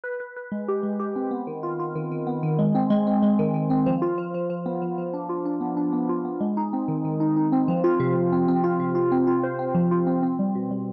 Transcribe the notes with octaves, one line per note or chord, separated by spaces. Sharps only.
B4
B4
B4
G#3
G4
G#3
G4
C4
B3
D#3
F4
F4
D#3
D#3
B3
D#3
G#3
C4
G#3
C4
G#3
D#3
D#3
C4
F3
F4
F3
F3
F3
B3
F3
F3
D4
F4
D4
B3
D4
B3
F4
B3
G#3
D#4
C4
D#3
D#3
D#4
D#4
C4
F3
F4
C3
C3
C4
C4
F4
C3
F4
C4
F4
C5
C4
F3
F4
C4
C4
G3
B2
G3